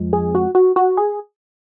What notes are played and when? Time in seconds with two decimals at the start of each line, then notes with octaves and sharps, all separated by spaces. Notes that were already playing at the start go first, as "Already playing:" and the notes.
Already playing: F2 F3 G#3
0.13 G#4
0.35 F#4
0.55 F#4
0.76 F#4
0.97 G#4